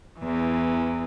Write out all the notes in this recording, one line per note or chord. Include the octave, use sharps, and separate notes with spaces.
E2 E3